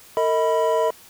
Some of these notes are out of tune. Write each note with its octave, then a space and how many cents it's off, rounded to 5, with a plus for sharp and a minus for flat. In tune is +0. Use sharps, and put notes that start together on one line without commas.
A#4 -45 D#5 +30 B5 +0